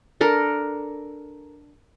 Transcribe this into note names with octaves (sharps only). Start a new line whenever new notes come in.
D4 A4 A#4